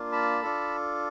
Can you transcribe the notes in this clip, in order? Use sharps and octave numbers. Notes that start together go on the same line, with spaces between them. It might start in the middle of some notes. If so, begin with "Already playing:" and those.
Already playing: A#3 D4 F4
A5 B5
D4 F4 A4